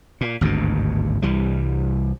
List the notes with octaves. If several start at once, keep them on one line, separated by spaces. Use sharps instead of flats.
A#2
G#1 D2 G2 B2
C2 E3 G3